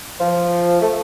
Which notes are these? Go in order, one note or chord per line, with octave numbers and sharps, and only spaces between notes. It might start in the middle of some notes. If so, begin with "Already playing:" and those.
F3
A3